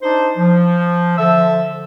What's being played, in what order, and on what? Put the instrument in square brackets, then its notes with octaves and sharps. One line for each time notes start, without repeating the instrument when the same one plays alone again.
[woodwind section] D4 D#4 C5
F3
D3 F3 A4 E5 E6